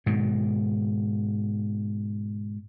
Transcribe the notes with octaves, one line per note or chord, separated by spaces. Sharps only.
G#2 B2 D#3